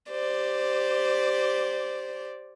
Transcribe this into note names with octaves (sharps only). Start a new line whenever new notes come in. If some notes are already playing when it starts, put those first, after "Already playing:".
G4 C5 D5